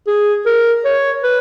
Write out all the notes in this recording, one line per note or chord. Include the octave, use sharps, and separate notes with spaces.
G#4
A#4
C#5
B4